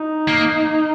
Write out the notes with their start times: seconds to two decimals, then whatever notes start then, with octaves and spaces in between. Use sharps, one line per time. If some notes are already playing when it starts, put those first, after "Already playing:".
Already playing: D#4
0.28 A#3